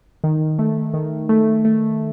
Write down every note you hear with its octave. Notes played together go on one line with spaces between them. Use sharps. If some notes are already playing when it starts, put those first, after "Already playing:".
D#3
A3
D#3
A3
A3